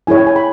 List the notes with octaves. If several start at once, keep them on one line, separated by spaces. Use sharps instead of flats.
E4 G#4 C#5 G#5
G5
G#5
B5